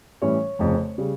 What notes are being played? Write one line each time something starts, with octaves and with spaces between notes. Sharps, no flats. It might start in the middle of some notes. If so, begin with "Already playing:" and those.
A2 E3 G3 C#4 C#5
F1 F2 C#3
C#3 G3